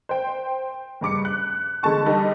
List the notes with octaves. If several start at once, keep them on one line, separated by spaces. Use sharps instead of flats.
C5 G5
F#1 G2 D6 C#7
F#6
D3 G#3 A4 A5 C#6
G3 D#4 A4